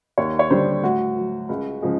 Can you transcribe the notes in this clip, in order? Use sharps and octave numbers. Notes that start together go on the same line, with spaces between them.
D#2 C#5
C#5
D3 G3 C5
A2 F#4
F#3
C#2
C#3 F3 G#3